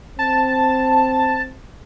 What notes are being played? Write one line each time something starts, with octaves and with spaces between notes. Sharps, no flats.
C4 A5